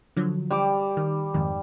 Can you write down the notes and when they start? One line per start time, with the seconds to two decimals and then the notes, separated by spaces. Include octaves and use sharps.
0.16 D3 F3 F#3
0.50 G3 D6
0.97 D#3
1.34 F2 G#2 D#3